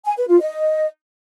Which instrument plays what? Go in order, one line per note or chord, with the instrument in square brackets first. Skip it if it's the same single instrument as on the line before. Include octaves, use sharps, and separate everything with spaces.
[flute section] G#5
B4
F4
D#5